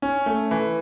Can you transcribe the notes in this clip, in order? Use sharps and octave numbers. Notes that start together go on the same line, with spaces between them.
C#4
A3
E3